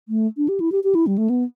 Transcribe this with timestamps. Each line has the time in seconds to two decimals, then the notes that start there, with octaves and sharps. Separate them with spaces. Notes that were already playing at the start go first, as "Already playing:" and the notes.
0.09 A3
0.37 D4
0.48 G4
0.60 E4
0.72 G4
0.84 G4
0.95 E4
1.07 G3
1.18 A3
1.30 B3